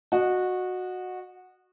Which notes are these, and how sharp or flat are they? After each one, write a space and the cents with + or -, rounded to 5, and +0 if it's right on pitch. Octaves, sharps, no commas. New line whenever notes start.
F#4 -15 D#5 -30